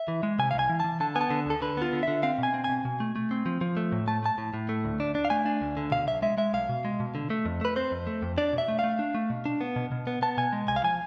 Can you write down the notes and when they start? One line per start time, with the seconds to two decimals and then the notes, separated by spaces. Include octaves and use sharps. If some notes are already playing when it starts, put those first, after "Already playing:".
Already playing: E5
0.08 E3
0.23 G#3
0.39 C3 G#5
0.51 F5
0.54 C2 G#5
0.69 E3
0.80 E3 A5
1.00 D3 A5
1.16 B3 G#5
1.21 A5
1.30 D3
1.46 D2 A4
1.62 D3 B4
1.77 B3 F4
1.93 D3
2.03 D3 E5
2.23 C4 F5
2.38 B2 G#5
2.54 C4
2.64 B2 G#5
2.85 B2
3.00 A3
3.16 A3
3.31 C4
3.46 F3
3.61 F3
3.77 A3
3.92 A2
4.08 A3 A5
4.23 A3 A5
4.38 A2
4.54 A2
4.69 A3
4.85 D2
5.00 D4
5.15 D4
5.25 F5
5.30 A3 G#5
5.46 D4
5.61 D2
5.77 D3
5.92 B2 F5
6.07 B1 E5
6.22 G#3 E5
6.38 G#3 E5
6.53 B1 F5
6.69 B2
6.85 G#3
7.00 B2
7.15 D3
7.30 A3
7.45 F2
7.61 A3 B4
7.76 C4 C5
7.92 F2
8.07 A3
8.22 F2
8.38 D4 D5
8.53 B2
8.58 E5
8.68 A3
8.79 F5
8.84 A3
8.99 D4
9.15 A3
9.30 B2
9.46 D4
9.61 B3
9.76 B2
9.92 B2
10.07 B3
10.22 B3 A5
10.37 B2 G#5
10.53 G#3
10.68 C2 G#5
10.76 F5
10.84 F3 G#5